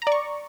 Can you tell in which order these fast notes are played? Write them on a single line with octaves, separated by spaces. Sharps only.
A#5 D5 C#6